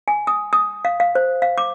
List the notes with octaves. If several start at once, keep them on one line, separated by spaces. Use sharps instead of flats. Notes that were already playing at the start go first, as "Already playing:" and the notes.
G#5
D#6
D#6
F5
F5
C5
F5
D6